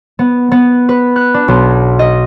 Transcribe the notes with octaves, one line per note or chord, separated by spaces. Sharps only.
B3
B3
B4
F#6
D4
B1
D#5